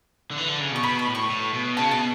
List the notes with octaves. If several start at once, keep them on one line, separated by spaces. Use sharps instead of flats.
D3
E3
D3
C#3
B2
C#6
B2 B5
B5
A2
C#6
A2
B2
C#3 A5
B2 A5